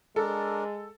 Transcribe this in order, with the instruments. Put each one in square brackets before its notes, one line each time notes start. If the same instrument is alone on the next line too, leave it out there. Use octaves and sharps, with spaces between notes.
[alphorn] G#3 [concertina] D4 A#4 [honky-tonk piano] A4